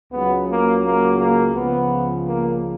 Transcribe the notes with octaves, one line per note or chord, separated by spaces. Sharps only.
C#2 C#3 F#3 B3
A#3
A#3
A#3
C#2 C#3 F3 B3
A#3